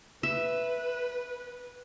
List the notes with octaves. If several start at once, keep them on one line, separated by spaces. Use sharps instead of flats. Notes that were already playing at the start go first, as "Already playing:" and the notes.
B4 E5